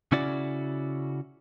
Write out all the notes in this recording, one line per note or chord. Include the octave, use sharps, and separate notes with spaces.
C#3 C#4 E4 F#4 D5